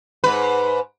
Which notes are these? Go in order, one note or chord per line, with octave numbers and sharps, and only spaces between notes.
G#2 B4